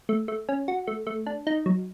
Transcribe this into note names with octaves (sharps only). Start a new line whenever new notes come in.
A3
A3
C#4
F#4
A3
A3
D4
D#4
F#3